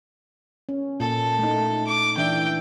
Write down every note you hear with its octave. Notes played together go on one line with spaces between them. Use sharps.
C#4
A#2 A4
A3 D#4
D6
E3 D4 E5 G5